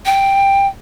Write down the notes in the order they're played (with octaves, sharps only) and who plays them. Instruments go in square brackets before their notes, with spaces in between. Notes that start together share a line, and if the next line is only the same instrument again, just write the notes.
[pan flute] G5